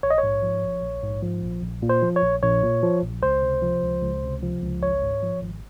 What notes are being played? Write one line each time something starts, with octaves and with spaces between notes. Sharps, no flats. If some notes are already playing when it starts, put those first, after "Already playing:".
A#1 C#5
D#5
C#5
G#2
F3
A#1
A#1
G#2
F3
A#1
A#1
A#2
C5
F3
C#5
A#1
A#1 C#5
A#2
F3
A#1
C#2 C5
C3
F3
C#2
C#2
C3
F3
C#2
G#1 C#5
G#2
F3
G#1